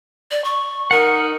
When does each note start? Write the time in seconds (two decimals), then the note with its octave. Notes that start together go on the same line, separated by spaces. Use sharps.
0.31 D5
0.44 C#6
0.91 D#4 A#4 F#5